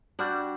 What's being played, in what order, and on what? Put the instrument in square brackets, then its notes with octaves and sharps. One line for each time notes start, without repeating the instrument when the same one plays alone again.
[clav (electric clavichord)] G3 [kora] D4 F#4